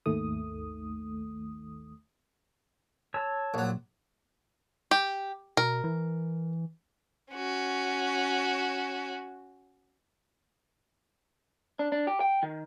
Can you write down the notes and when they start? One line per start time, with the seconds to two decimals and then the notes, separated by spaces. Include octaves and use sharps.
0.06 G#1 D#2 D#3 A3 D#6
3.14 C#5 A5 E6
3.54 A#1 F#3
4.91 G4
5.57 B2 A#4
5.84 E3
7.34 C#4 F#4
11.79 D4
11.92 D4
12.07 G4
12.20 G5
12.43 D#3